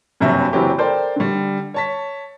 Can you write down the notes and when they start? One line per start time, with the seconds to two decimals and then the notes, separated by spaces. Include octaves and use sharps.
0.20 F#1 G2 C3 F#3 E5
0.53 F#1 E3 F#3 C4 E4 G4
0.78 A4 A#4 C5 D5 G5
1.16 D3 G3
1.74 C#5 A5 B6